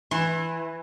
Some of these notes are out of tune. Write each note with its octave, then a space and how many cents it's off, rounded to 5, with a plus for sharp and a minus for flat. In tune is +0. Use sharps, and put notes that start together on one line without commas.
E3 +5 E4 +0 C6 +40